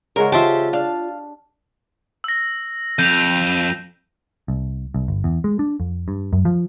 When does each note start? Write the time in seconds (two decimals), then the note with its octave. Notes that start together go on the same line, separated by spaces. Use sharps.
0.16 C#3 G#3 F#4 A#4
0.32 F4 G4 C5 E5 A5
0.73 D4 F5
2.24 E6 A#6
2.99 F2 G6 E7 F7
4.48 C2
4.94 C2
5.08 G1
5.24 E2
5.44 G#3
5.59 D4
5.80 F2
6.08 G2
6.33 F#2
6.45 F3